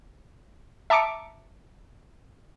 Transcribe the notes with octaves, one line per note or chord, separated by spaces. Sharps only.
E5 A5 A#5 D6 C#7 D7